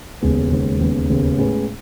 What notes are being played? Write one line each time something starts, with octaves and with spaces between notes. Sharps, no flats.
E1 D#2 C#3 G#3 B3
E1 D#2 C#3 G#3 B3
E1 D#2 C#3 G#3 B3
E1 D#2 C#3 G#3 B3
A2 G#3 C#4 G#4 B4